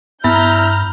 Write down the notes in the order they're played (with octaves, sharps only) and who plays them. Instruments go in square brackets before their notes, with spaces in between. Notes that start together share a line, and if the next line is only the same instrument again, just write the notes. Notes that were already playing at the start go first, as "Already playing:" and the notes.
[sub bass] G2 [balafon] B3 [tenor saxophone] E4 [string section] A#5 F6 G6